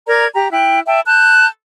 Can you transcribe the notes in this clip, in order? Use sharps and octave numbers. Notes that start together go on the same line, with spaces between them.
A#4 D5 A#5 G#6
G4 A#5
E4 G5 F#6
E5 G5 A5
A5 F#6 G6